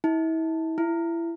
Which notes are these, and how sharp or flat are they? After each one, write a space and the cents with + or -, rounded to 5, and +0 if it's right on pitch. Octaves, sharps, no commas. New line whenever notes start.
E4 -35
E4 +25